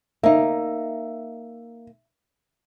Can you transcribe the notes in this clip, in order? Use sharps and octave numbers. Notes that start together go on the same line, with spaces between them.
A#3 D#4 E5